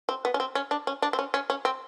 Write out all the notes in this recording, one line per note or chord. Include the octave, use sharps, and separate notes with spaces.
C4
B3
C#4
C4
C#4
D4
C#4
D4
C4
C#4
C#4
C#4
C4